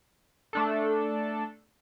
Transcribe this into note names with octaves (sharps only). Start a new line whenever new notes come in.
A3 D4 A4